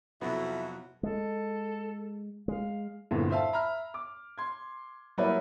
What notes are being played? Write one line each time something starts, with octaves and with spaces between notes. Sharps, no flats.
F2 C3 F#3 B3 E4 F#4
G#3 A4
G#3 F5
E2 G2 A#2 D3 E3 C4
C5 E5 F5 A5
E5 A#5 B5 F6
D6
C6 G#6
F#3 G3 A#3 E4 B4 D5